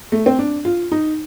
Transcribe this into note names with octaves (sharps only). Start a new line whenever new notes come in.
A3
C4
D4
F4
D#4